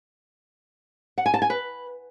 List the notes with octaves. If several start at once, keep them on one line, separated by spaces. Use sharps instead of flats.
F#5
G#5
A5
G#5
B4